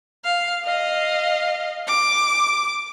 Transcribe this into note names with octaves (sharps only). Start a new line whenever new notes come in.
F5
D#5 F5
D6